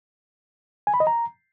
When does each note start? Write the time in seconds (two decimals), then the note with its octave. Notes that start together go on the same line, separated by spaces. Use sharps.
0.87 G#5
0.94 B5
1.00 D#5
1.07 A#5